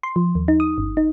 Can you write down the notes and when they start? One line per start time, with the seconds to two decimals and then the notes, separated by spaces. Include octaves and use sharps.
0.03 C6
0.16 F3
0.35 D#2
0.48 D#4
0.60 D#6
0.78 G1
0.97 D#4